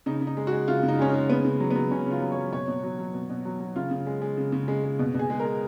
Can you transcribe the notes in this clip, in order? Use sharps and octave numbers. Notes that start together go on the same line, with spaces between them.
C#3 D#4
C#3
D#4
G#3
F#4
G#3
C#3 F4
C#3
D#4
G#3 C#4
D#4
G#3
C#3 B3
C#3
F#3
B3
F#3
C#3 C#4
C#3
F4
F#3
C#5
F#3
B2 C#5
B2
F#3
F#3
B2
B2
F#3
F#3
C#3 F4
C#3
G#3
G#3
C#3
C#3
G#3
G#3
B2
B2 G#4
G#3
A#4
G#3